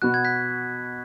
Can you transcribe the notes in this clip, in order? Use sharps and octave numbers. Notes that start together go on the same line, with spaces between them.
B2 B3 F#4 F#6
G#6
F#6 B6